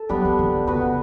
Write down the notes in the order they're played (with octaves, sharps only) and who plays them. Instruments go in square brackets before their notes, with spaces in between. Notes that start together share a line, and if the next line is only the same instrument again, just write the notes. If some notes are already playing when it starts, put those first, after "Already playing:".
Already playing: [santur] A4
[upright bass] F#3 [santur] B3 D4 G4
[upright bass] E3
D3
[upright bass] C#3 [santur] B3 F#4 B4
[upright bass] C#3